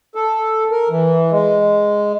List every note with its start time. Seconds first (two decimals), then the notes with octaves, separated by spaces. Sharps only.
0.15 A4
0.71 A#4
0.89 E3
1.31 G#3